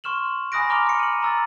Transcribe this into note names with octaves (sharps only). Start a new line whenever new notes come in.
C6 C#6 F6 E7 F#7
G#5 B5 D#6 F#6 A#6 D7
A#5 C6 D6 F6 F7
F6 C#7
D#7 F#7
A#5 E6 A6